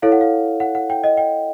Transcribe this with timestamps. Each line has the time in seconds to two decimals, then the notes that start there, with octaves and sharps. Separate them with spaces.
0.02 E4 A4 C#5 F5
0.12 F#5
0.21 F5
0.60 F#5
0.75 F#5
0.90 G5
1.04 D#5
1.17 G5